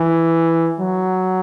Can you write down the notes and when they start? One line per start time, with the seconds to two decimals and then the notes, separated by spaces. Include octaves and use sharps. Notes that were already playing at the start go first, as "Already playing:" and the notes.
Already playing: E3
0.80 F#3